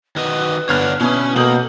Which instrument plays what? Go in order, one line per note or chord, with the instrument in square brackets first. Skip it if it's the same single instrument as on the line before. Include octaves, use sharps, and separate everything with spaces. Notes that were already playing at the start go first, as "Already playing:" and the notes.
[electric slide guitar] D#3 F#4 D#5 [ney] B4
[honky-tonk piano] G1 F6 [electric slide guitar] C#5 D5 F#5
[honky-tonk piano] B2 D#6 [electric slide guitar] C#4 [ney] E4
[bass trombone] B2 [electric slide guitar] A#3 [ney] A4 [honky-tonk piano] D#6 G6 F#7